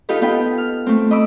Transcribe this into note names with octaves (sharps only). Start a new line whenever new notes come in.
D#4 F4 G4 A4 B4
B3 D#4 F4 G5 B5
F6
A3 C4
D#5 B5 D6 E6